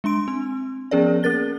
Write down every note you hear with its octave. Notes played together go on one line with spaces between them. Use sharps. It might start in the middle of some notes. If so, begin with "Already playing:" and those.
G#3 D4 C6 D7
C4
F3 B3 C#4 G#4 A#4 D5
A#3 C#4 A#4 A6 G7